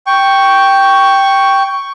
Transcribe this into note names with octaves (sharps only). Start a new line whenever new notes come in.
G5 C#6